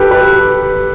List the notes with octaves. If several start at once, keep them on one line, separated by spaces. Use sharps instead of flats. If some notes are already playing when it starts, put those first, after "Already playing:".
Already playing: G4 A4 B4
G4 B4